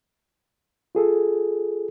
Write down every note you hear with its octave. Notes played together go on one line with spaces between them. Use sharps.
F4 G#4 A4